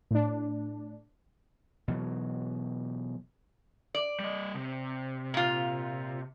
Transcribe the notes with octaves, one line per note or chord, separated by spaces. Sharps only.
A2 D4
B2 E3 F#3
D5
G3 D#5
C3
A#2 F4